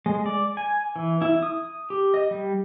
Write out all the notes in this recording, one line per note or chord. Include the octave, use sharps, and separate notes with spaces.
G#3
D5
G#5
E3
E4
D#6
G4
D#5
G3